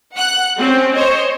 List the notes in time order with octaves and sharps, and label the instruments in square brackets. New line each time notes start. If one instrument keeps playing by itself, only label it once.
[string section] F#5 F#6
C4 C#4
C5 C#5 D#5